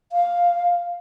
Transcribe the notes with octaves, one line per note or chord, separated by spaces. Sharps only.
F5